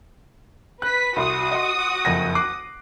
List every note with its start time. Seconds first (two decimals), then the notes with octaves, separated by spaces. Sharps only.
0.82 B4 F#6 B6
1.16 C2 F#4 C6 D#6
1.51 D#5 C6
2.05 F#1 F2 A#6
2.35 D6 F#6 C7